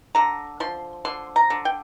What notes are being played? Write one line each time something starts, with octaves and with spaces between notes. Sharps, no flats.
D3 A#5
F3 C6
D3 C6
A#5
D3
G5